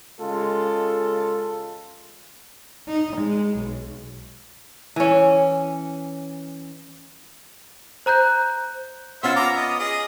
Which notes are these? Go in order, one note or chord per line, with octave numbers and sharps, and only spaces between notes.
C#3 G#3 F4 A4
D#4
G#3
B1
E3 C#4
C5 A#5 F#6 G6
B3 C#4 F4 C5 E5
A#5 D6
D#5
G#4 D#5